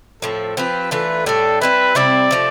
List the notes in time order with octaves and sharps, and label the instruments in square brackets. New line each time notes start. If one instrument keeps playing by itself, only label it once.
[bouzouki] A2 F3 C4 [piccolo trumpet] A4
[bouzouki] F3 C4 G4 [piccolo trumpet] B4
[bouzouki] E3 A3 D4 F4 [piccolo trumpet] B4
[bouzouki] A2 G3 D4 [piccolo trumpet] A4
[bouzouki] G3 C4 E4 [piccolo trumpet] B4
[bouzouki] C3 G3 C4 E4 [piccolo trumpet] D5
[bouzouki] C3 F3 A3